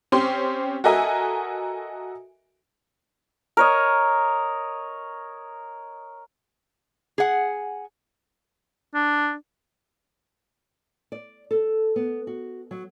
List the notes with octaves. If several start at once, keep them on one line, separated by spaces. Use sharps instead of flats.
C4 C#4 G4 C6
F#4 A4 A#4 D#5 E5 G#5
A#4 C#5 D#5
G#4 F#5
D4
D5
A4
B3
F#4
F#3